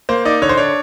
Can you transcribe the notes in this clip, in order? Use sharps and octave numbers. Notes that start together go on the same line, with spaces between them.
A#3 C5
D#4 D5
D3 C#5
C5
D4 C#5